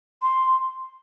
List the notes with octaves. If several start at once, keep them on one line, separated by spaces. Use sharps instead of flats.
C6